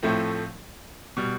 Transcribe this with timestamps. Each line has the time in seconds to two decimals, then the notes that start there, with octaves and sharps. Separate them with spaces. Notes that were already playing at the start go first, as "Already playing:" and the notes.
0.03 A2 F3 A3 C4
1.17 B2 G3